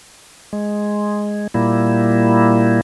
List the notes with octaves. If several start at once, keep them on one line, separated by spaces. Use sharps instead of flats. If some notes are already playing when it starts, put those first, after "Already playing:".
G#3
A#2 G3 A#3 E4